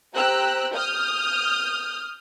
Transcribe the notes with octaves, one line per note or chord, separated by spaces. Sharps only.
G4 C5 G5 A#5 E6 F#6
D#6 F6 G6